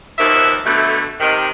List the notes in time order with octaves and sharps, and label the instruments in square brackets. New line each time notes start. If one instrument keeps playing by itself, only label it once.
[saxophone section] D#2 B2 F3 A#4 E5
B2 D3 A3
C3 D#3